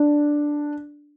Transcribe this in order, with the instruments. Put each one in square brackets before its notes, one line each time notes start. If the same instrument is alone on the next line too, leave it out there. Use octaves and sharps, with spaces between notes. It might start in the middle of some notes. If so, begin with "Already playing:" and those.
Already playing: [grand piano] D4